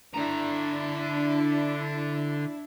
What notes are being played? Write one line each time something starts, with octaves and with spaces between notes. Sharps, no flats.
D3 D4 E4 A#5